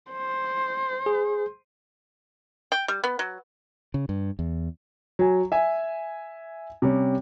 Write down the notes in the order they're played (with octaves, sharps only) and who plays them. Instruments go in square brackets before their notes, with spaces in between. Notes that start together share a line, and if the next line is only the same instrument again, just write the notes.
[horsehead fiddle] C5
[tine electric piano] G#4
[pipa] G5
G3
B3
F#3
[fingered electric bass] C#3
G2
E2
[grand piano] F#3 G#5
E5 G#5
C3 G3 C#4